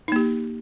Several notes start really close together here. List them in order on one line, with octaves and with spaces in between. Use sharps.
D#4 A#3 G4